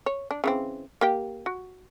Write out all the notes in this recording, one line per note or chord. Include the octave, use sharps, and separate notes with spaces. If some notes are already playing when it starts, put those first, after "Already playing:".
C#5
D4
C#3 E3 C4
A#3 G4 G5
F#4